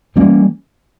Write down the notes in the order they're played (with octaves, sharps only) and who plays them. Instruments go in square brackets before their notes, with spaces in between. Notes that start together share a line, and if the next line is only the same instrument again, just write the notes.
[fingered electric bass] E3 G3 A#3 C#4